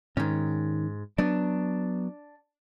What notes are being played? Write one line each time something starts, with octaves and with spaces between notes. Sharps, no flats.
G#2 D#3 C#4
F#3 B3 D4